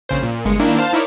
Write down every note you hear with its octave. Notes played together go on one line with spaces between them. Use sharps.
A#1 C#3 C5
A#2
G1 G#3 C#7
D#3 A#3 D4 E4
C5 F5 A5
D#4 E4 A#4 C#5 D5